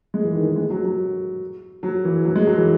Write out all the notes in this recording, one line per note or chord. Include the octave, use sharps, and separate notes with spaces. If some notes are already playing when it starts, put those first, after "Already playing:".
G#3
E3
D#3
D#3
G#3
F#3
F#3
F#3
E3
F#3
G#3
F#3
E3